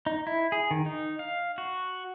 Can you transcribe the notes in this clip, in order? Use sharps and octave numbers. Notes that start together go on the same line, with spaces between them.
D#4
E4
G#4
D#3
D#4
F5
F#4